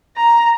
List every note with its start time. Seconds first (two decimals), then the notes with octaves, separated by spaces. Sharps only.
0.17 A#5